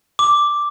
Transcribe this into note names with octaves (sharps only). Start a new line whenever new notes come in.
D6